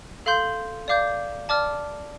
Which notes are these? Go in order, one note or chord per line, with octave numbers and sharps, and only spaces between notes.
A4 F5 C6 G6
D5 F5 D6 G6
D5 A5 D6 F6